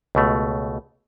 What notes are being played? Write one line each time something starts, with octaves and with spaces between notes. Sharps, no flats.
C#2 B2 A3